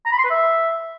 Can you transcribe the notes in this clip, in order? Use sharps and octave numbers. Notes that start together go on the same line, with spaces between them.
A#5
B5
C6
B4
E5